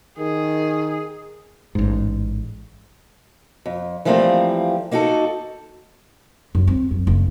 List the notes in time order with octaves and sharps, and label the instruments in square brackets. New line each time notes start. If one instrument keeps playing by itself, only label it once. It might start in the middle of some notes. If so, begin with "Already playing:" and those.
[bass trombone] D#3 [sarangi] G#4
[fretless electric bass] A1 G#2
[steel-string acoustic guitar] F2
E3 F3 G3 A3 A#3 C4
A#3 D#4 F#4 G#4 A4
[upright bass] F#2
C4
F#2
F#1